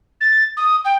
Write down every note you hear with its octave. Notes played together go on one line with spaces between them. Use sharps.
A6
D#6
G5